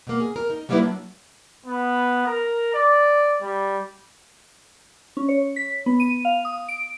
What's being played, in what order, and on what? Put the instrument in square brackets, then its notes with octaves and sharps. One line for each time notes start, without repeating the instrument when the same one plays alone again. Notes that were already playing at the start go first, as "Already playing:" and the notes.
[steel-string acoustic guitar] B2 A#3
G#4
A#4
D#4
F#3 G3 A#3 D#4 E4 B4
F#3 D4
[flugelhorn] B3
A#4
D5
G3
[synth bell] C#4
C#5
B6
B3
D#7
F5
D#6
D7